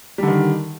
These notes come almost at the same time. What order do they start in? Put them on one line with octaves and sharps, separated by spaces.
G3 D3 D#3